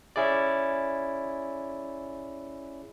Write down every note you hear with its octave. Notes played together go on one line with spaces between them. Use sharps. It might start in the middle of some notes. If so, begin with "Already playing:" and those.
C#4 E4 G#4 D5